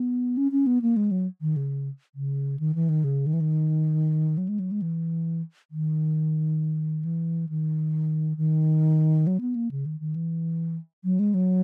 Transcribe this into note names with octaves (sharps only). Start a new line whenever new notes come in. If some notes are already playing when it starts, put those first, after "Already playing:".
Already playing: B3
C#4
C#4
B3
A#3
G#3
F#3
D#3
C#3
C#3
D#3
E3
D#3
C#3
D#3
E3
D#3
F#3
G#3
F#3
G#3
E3
D#3
E3
D#3
D#3
F#3
B3
A#3
C#3
D#3
D#3
E3
F#3
G#3
F#3